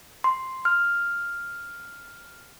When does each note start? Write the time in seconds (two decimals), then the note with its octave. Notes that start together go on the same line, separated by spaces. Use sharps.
0.24 C6
0.65 F6